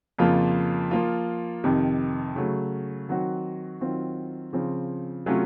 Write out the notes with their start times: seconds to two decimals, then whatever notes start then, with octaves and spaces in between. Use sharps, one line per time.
0.18 F2 C#3 F3 A#3 F4
0.91 F3 A#3 F4
1.64 F2 C3 D#3
2.36 C#3 F#3 A3
3.08 D#3 F#3 C4 F#4
3.81 D#3 F#3 C4 F4
4.53 C#3 F3 C4
5.26 C3 F#3 A3 C#4 F4